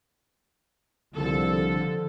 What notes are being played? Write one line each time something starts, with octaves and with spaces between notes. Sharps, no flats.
C2 D3 F3 A4